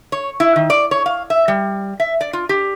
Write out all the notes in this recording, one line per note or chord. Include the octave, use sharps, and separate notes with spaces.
C#5
E4
D#3
D5
C#5
F5
E5
G3
E5
D5
F4
G4